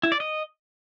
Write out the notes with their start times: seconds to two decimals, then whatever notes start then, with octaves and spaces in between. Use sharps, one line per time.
0.03 E4
0.12 D5
0.20 D#5